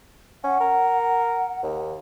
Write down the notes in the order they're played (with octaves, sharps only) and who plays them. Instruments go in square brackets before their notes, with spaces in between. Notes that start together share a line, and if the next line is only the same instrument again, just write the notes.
[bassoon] C#4 [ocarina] F#5
[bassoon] A#4
D#2